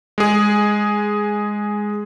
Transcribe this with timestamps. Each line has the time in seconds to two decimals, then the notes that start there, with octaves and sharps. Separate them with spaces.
0.18 G#3 G#4